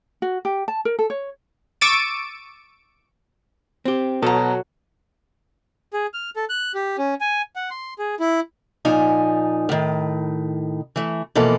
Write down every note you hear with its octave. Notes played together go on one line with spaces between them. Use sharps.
F#4
G4
A5
A#4
A4
C#5
C#6 D6 E6 A6 D7 D#7
C4 G4
B2 F#3 A4 A5 A#5
G#4
F6
A4
F#6
G4
C#4
G#5
F#5
C6
G#4
E4
A#2 F3 D#4 G#5
A2 D#3
E3 A3
B2 E3 F3 A#3 A4